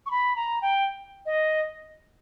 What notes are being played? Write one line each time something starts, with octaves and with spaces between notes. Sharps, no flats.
C#6
B5
A#5
G5
D#5